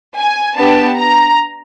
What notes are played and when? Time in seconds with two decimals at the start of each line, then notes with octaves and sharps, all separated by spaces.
0.17 G#5
0.56 B3 D4 G4 A5
0.96 A#5